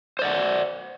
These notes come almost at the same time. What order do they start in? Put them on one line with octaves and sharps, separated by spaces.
C5 D5 F#5